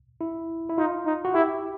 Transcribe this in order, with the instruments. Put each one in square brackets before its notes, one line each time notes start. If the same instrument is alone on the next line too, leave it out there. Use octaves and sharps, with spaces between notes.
[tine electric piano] E4
E4
[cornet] D#4 [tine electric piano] F4
[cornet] D#4
[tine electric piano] F#4
[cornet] E4 [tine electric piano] G4